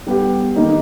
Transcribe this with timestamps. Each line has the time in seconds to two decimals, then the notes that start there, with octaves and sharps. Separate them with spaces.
0.07 G3 B3 G4
0.56 D#3 A#3 D#4